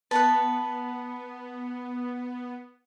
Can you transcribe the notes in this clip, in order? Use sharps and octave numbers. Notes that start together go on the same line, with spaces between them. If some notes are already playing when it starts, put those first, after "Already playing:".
B3 B4 A5